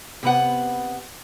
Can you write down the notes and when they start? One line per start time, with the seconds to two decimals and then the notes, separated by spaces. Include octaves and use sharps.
0.23 C3 B3 F#5